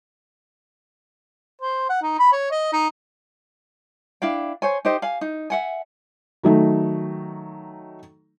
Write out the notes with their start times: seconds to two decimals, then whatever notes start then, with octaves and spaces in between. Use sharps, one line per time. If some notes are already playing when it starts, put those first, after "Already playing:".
1.61 C5
1.89 F#5
2.02 D#4
2.19 B5
2.32 C#5
2.51 D#5
2.72 D#4
4.22 D4 E4 F5 G5
4.62 C5 C#5 G#5
4.85 D#4 G4 C5 D#5
5.02 F5 G#5
5.21 D#4
5.50 E5 F#5 G#5
6.43 D#3 F#3 A3 D#4